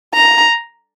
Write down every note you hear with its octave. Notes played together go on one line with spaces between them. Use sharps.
A#5